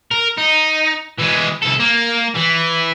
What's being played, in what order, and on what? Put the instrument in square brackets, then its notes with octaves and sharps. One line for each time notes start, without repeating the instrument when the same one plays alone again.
[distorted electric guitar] A#4
D#4
E3 G#3
C2 A4
A#3
E3